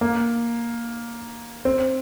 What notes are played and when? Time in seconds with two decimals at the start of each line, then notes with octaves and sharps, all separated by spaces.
0.01 A#3
1.65 C4